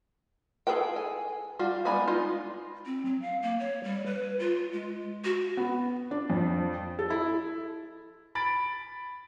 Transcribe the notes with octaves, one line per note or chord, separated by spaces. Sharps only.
G#4 A4 B4 G5
G#5
G3 F4 F#4
G3 G#3 B3 G#5 B5
D#4 F4
C4
F#3
F5
A#3
C#5
G3
B4
F4
G#3
F#4
B3
D4
F2
A4
E4
B5 A6 D7